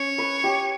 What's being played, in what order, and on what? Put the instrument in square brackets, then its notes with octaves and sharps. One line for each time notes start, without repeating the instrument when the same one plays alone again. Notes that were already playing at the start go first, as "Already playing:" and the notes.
Already playing: [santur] C#4 [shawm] C#5
[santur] B4
G4